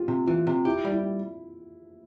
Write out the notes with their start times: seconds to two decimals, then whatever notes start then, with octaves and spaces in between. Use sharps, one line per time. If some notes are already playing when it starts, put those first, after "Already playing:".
Already playing: F4 G4
0.08 C3
0.27 E3 F4
0.47 C3
0.65 E4 G4
0.84 G3
0.92 E4